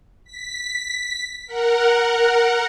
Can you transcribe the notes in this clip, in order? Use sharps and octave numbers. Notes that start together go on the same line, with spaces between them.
B6
A#4 F#5